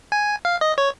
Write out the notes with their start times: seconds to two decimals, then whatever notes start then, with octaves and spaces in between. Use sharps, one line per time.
0.12 G#5
0.45 F5
0.61 D#5
0.78 C#5